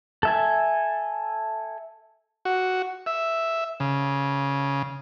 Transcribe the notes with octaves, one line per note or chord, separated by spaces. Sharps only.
A4 E5 G#5
F#4
E5
C#3